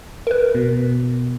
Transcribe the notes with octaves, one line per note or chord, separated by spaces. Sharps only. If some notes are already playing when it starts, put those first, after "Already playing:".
A#4 B4
B2